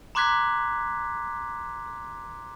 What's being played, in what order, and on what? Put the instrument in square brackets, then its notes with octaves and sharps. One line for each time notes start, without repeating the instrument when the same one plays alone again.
[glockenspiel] A#5 C6 D6 F#6 G#6 B6